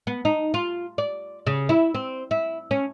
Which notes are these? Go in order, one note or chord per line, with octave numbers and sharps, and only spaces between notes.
B3
D#4
F4
D5
C#3
E4
C4
E4
C#4